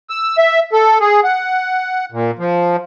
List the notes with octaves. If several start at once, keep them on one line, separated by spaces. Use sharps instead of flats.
E6
E5
A4
G#4
F#5
A#2
F3